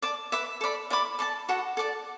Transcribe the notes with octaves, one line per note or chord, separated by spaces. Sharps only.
D5 A5 D6
B4 E5 D6
A4 D5 B5
E4 D5 B5 D6
A4 D5 A5
F#4 A4 F#5
A4 D5 A5